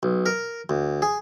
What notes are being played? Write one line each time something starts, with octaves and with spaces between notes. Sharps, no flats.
B1
A#4
D2
G#4